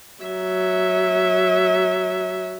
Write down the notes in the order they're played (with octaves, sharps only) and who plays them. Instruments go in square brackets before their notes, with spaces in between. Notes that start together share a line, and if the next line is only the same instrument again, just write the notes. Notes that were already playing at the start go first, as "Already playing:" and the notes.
[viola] F#3 E5